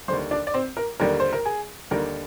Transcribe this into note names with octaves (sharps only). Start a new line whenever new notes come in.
D#2 D3 G3 C5 C6
D4 D5
D5
C4 C5
A#4
D#2 D3 G3 A#4
C5
A#4
G#4
D#2 D3 G3 A#4